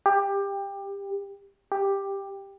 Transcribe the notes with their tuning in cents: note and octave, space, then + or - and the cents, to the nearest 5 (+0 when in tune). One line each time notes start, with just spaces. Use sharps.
G4 +20
G4 +10